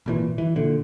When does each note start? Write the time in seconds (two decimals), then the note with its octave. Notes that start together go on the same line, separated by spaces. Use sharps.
0.06 G#1 A#2 E3
0.38 E3
0.56 A#2 D3